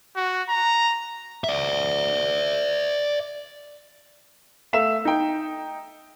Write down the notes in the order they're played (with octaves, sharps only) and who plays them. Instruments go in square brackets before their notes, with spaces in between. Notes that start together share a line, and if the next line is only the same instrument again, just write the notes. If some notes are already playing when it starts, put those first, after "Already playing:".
[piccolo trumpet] F#4
A#5
[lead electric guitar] D5 E5
[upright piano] A3 E5 F5 E7
D#4 G5